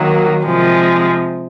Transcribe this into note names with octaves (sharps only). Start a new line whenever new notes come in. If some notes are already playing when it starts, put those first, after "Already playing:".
Already playing: D#3 F#3 A#3
C3 F3 G#3